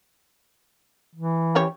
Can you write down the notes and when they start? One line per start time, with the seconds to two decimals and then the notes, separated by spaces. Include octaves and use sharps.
1.15 E3
1.55 C#4 G4 C#5